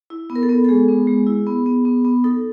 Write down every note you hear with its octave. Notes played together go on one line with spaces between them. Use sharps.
E4
B3
A#4
A4
B3
A4
G#3 G#4
B3
G#3
E4
B3
B3
B3
B3
D#4 A4